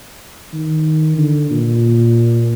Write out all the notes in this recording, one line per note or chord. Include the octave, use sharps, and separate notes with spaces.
D#3
D3
A#2